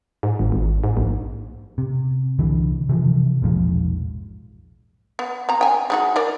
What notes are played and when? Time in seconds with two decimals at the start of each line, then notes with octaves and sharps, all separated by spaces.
0.23 G#2
0.39 G#1
0.52 G#1
0.84 G#2
0.97 A#1
1.78 C3
2.39 C2 D3 E3
2.89 C3 E3 F3
3.42 E1 A#1 G#2 F3
5.19 B3
5.49 C4 A#5
5.61 G5 G#5
5.90 G#3 D#4 F#4
6.16 A#4 D5